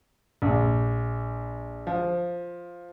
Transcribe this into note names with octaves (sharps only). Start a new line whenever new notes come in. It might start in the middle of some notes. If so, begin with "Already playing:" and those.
A#1
F3